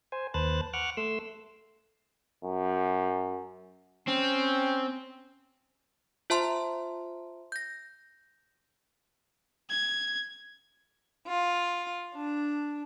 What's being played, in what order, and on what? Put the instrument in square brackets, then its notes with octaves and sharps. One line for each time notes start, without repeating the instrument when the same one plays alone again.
[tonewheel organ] C5 G#5
D#2 B4 C5 A5 F#6 A6
F#5 C#6 D6 F6 F#6
A3 C6 E6
[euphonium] F#2
[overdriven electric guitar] C4 [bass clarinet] C#4
[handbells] F4 C5 E5 A5 A#5 C6
G6 A#6
[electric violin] G#6
[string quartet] F4
D4